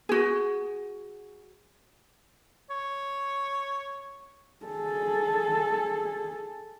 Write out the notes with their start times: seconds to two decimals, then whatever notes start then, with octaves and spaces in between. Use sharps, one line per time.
0.09 F#4 G#4
2.70 C#5
4.66 G#4 A4